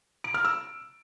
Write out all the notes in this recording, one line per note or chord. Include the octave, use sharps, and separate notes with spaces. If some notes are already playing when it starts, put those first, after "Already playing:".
D7
F6
E6